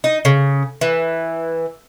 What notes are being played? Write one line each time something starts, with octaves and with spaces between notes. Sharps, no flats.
D#4
C#3
E3